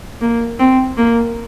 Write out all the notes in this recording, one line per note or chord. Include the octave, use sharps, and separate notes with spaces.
A#3
C4
A#3